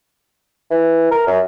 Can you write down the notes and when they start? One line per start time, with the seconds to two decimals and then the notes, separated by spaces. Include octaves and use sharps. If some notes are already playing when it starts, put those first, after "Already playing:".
0.71 E3
1.11 A#4
1.27 F#2